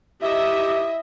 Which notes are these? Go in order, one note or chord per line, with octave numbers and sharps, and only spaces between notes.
E4 G4 D#5 E5